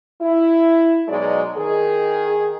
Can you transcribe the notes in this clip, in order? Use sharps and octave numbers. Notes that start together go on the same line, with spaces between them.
E4
B2 F#3 G#3 D#4 D5
D#3 G#4